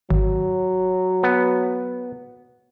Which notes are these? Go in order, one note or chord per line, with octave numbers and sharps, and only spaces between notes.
G#1 F#3
B3